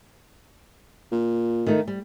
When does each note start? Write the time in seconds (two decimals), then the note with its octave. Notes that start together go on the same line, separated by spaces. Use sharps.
1.12 A#2
1.67 D#3 A3 D#4
1.88 G3